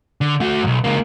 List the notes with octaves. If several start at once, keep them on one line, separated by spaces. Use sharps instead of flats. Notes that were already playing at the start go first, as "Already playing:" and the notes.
D3
A3 F#4
B1 F#2
C#2 A#3